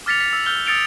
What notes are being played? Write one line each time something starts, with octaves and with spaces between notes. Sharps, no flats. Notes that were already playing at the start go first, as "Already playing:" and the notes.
D6 F6 A6 B6 C#7 F7
B6
E6
E6 F6 G6 G7
D#6 E6 A6 C#7 D7 F7